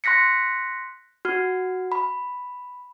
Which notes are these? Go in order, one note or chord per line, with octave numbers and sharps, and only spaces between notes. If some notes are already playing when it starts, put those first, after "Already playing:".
C6 F#6 A#6 B6 C#7
F#4 F6
B5